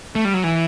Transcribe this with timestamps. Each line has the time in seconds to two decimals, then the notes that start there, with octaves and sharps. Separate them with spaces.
0.15 A3
0.25 G3
0.34 F#3
0.44 E3